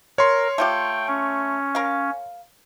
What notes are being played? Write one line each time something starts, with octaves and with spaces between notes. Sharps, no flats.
A#4 C#5 C6
A3 F4 G4 G5
C#4
A#4 F5